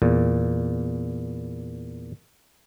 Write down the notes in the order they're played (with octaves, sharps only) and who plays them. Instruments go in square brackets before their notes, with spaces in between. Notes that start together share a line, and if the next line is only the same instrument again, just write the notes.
[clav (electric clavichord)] E2 A#2